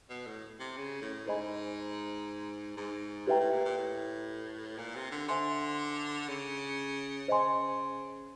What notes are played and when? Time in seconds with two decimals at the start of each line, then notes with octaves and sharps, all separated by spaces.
0.10 B2
0.26 A2
0.60 C3
0.77 C#3
1.02 A2
1.27 G#2 G#4 C5 D#5 G#5 B5
2.77 G#2
3.27 A2 G4 B4 E5 G5 A#5
3.40 A2
3.52 A#2
3.65 A#2
3.78 A2
4.78 A#2
4.95 C3
5.11 D3
5.28 D3 C5 E5 G#5 C6
6.28 C#3
7.28 C#3 C5 D#5 G#5 C6